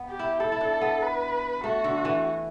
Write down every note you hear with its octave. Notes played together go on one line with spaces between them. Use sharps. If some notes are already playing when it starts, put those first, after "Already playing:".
Already playing: B3
G4
E4
E4 A4
E4
D4
B3
B4
A3 F#4
D3
E3